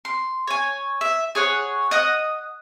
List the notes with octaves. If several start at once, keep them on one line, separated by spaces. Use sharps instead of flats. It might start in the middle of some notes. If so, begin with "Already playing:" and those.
C6
C#5 G#5
E5
G#4 C#5 F#5
D#5 F#5 D#6